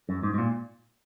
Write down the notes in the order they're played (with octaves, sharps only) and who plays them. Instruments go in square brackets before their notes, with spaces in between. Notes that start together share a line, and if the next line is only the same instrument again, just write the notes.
[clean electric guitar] F#2
G#2
G#2
A#2